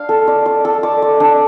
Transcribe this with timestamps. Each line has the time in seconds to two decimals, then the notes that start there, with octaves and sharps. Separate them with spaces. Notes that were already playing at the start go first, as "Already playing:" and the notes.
Already playing: D4 D5 F5
0.09 A4
0.27 D5
0.46 D5
0.65 A4
0.83 D5
1.02 D5
1.20 D4